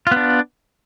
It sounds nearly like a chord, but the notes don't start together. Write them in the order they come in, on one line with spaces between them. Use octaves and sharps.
F4 B3 D4